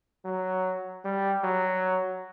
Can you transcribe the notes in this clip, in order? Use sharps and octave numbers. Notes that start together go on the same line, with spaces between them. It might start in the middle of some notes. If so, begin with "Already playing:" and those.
F#3
G3
F#3